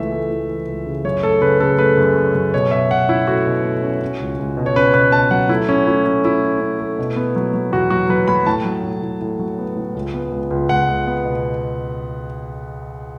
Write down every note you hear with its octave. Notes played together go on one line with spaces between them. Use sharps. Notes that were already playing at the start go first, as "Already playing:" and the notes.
Already playing: C#2 E3 A3 E5
A3
E3
E3
C#2
C#3
F#2 C#5
A3 A4
C#3 B4
C#3 A4
A3 B4
F#2
A3
F#2
B2 C#5
B2 E5
B2 F#5
C#4 E4
A3 F#4
B2
A3
C#4
C#4
C#2
C#2
B2
C#5
C#4 B4
B2 B4
B2 A5
F#3 F#5
A3 E4
C#4
A3 E4
A3 C#4
A3 E4
A3
C#4
A3
B2
B3
F#3
F#3
E2 F#4
F#3 F#4
F#3 B4
F#3 B5
A2 A5
F#3
A2
A2
A2
F#3
B3
A2
C#2
B3
C#2
C#2
C#2 F#5
C#2
B3
B2